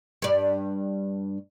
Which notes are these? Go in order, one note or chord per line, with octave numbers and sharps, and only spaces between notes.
G2 D5